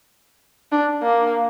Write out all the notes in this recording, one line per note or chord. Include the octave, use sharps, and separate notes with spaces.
D4
A#3